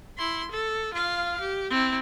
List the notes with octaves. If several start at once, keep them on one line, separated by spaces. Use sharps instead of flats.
E4 C6
A4
F4 F5
G4
C4 E4